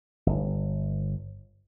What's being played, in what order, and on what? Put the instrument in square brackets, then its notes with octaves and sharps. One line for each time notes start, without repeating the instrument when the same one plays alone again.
[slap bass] G1